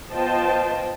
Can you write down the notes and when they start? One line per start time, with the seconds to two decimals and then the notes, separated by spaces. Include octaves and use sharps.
0.13 B3 F4 C5 D#5 G5 A5